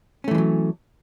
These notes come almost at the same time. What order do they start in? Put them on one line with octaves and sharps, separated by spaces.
C#4 A3 E3 G#3 F#3